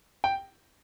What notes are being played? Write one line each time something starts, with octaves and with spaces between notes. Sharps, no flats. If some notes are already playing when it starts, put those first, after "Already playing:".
G5